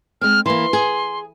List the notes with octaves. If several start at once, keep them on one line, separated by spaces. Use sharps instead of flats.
G#3 C4 F6
E3 A#3 C6
G#4